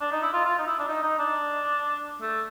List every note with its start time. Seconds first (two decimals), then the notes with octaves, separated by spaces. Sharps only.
0.01 D4
0.12 D#4
0.22 E4
0.33 F4
0.45 F4
0.59 D#4
0.67 E4
0.79 D4
0.89 D#4
1.03 D#4
1.19 D4
2.21 A3